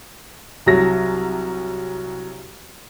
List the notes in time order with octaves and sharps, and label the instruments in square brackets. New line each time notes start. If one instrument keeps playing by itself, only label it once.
[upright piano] C2 F#3 A#6